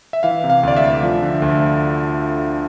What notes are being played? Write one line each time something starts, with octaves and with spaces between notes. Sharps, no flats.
E5
E3 F5
C3
F5
D2 D5
E5
A3
F3
D3
D2